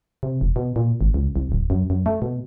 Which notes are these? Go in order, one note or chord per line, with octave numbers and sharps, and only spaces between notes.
C3
E1
B2
A#2
G#1
C#2
C2
D1
F#2
F#2
A3
B2